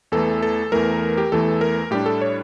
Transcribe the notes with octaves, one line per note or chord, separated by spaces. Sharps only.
E2 E3 A3 A4
A4
E2 E3 A3 A#4
G4
E2 E3 A3 A4
A#4
A2 G3 D4 G4
A4
C#5